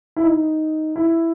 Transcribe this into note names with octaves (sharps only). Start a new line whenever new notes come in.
E4
D#4
E4